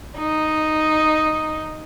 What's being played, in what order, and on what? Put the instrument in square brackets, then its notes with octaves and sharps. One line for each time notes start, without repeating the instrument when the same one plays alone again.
[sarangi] D#4